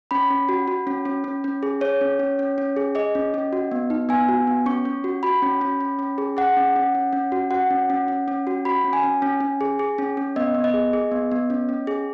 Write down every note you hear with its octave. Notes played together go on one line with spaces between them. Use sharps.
C#4 B5
C#4
F#4
F#4
C#4
C#4
C#4
C#4
G#4
G#4 C#5
C#4
C#4
C#4
C#4
G#4
G#4 D#5
C#4
C#4
F#4
B3
D#4
B3 G#5
F#4
B3
C#4 C#6
C#4
F#4
F#4 B5
C#4
C#4
C#4
C#4
G#4
G#4 F#5
C#4
C#4
C#4
C#4
F#4
F#4 F#5
C#4
C#4
C#4
C#4
F#4
F#4 B5
C#4
G#5
C#4
C#4
C#4
G#4
G#4
C#4
C#4
B3 D#5
B3
D#5
G#4
G#4
B3
B3
C#4
C#4
G#4